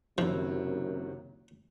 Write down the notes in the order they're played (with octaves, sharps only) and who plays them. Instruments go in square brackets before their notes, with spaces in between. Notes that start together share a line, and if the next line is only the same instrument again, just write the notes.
[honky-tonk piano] F#1 C3 D#3 [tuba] F#2 [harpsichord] F3 [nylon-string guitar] F#3 E4